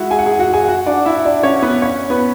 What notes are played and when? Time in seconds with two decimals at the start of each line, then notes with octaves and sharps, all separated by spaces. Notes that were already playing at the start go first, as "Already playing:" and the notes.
Already playing: G#3 E4 F#4 E5 F#5
0.11 G#4 G#5
0.19 F#5
0.25 G#4 G#5
0.39 F#4 F#5
0.53 G#4 G#5
0.68 F#4 F#5
0.86 D4 D5
1.05 E4 E5
1.25 D4 D5
1.43 C#4 C#5
1.62 B3 B4
1.82 C#4 C#5
2.10 B3 B4